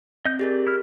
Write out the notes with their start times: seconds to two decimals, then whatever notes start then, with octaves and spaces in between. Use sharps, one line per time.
0.25 C4 D#5 G6
0.39 G4 G#4 A#4 D5
0.67 E4 F6